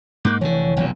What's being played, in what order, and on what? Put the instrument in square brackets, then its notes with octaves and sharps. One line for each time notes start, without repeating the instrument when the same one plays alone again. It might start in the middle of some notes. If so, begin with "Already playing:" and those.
[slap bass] G#2 A#3 [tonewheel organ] D6 F#6 G6
[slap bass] F1 A2 D3 [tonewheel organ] E3 C#5
[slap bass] F1 B1 F2